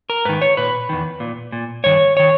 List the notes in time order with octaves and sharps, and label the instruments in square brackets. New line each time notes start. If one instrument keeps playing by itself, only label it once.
[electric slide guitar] A#4
G#2 D#3 B4
C#5
A#2 B4
E2 D#3
A#2
A#2
G2 D#3 C#5
D#3 C#5